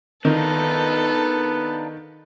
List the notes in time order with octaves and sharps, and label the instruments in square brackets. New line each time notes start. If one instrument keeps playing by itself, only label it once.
[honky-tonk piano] D#3 [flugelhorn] B3 [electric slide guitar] D4 D#4 F4 [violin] A4